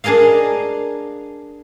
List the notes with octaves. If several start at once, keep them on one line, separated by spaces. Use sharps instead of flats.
D4 G#4 A#4 D#5 F5